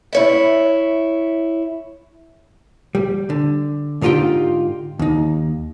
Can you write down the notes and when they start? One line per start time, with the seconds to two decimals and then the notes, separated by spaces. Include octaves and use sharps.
0.13 E4 C#5 E5
2.95 G3
3.30 D3
4.01 G#2 D3 D#4 F4 G4 G5
4.99 D#2 D#4